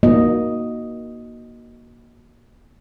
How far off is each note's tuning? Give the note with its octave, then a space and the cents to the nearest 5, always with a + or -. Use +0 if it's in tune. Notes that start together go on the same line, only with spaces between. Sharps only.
A#3 +25 F#4 +0 D#5 +0